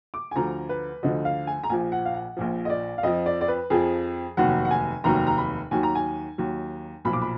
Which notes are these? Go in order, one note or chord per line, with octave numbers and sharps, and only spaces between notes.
D6
G#5
D2 D3 F3 A#5
B4
D2 D3 F3 D#5
F5
G#5
A#5
A#1 A#2 F3 G#5
F#5
F5
F#5
A#1 A#2 F3
D#5
D5
F5
F2 F3 D#5
D5
D5
B4
F2 F3 G#4
F1 D#2 D#3 F#3 F#5
F#5
G#5
F1 D#2 D#3 F#3 A#5
A#5
B5
D#2 D#3 F#3 G#5
A#5
G#5
D#2 D#3 F#3
B1 A#2 F3 B5
D6
B5